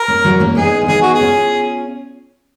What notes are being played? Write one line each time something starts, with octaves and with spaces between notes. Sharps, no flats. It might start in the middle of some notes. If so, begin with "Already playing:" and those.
Already playing: A#4
A#3 C#4
F#3 A#3
A#3 C#4
B3 D#4 G#4
F4
B3 D#4 G#4
F#4
G#4
C#4 F4